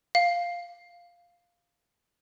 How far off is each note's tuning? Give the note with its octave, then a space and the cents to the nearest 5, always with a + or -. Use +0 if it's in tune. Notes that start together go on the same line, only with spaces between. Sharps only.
F5 +0